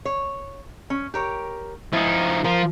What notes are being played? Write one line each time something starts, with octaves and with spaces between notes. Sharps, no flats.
C#5
C#4
G4 A#4 C#5
F3 D#4 E4
F3 F4 A#4